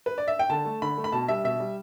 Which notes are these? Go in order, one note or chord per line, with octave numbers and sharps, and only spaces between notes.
B4
D5
E5
G5
D3 A5
A3
D3 B5
A3
B5
B2 A5
G3 E5
B2 E5
G3